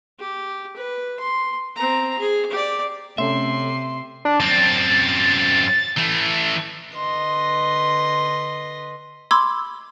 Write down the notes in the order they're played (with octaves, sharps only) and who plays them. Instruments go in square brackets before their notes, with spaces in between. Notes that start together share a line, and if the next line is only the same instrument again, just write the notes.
[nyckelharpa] G4
B4
C6
C4 A#5
G#4
G4 D5
[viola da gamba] C3 [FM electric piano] A3 C#4 A4 [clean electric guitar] E5 [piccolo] C6
[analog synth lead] D4
[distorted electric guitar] F#2 C4 [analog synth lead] A6
[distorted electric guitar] E3 A3
[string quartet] D3 B4 D#5 C6 A#6
[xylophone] B5 C6 D6 E6 G#6